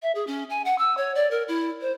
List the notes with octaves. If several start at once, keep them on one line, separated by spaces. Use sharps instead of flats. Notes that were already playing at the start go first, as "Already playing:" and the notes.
E5
G#4
C#4
G#5
F#5
E6
C#5
D5
A#4
E4
C5